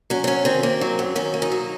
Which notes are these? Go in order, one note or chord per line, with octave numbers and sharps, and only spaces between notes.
F#3 C#4
C4
F#2 C#4
D#3 C4
A#3 C4
F#3
F#2
D#3 C#4
A#3
D#4
F#3